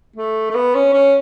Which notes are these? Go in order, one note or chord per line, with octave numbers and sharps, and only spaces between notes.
A3
A3
B3
C#4
C#4